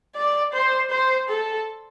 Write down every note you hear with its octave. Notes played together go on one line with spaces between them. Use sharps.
D5
C5
C5
A4